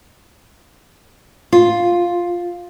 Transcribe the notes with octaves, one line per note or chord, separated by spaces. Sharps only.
F4